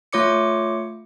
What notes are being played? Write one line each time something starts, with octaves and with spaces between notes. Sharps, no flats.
A3 F4 C#5 D6 C#7